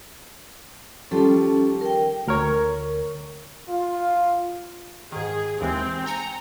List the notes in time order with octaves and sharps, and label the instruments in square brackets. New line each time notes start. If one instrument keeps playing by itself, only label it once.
[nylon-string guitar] D#3 F3 G3 [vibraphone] C#4 A4 A5
[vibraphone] A#4 G5
[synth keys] D2 A#4 C#5
[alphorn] F4
[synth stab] G#2 D#3 [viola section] G#4
[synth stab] D#2 E3 G#3 [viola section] C4
[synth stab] G5 G#5 C#7 [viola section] A#5